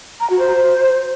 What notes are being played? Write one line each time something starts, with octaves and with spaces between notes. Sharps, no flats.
A#5
F#4
C5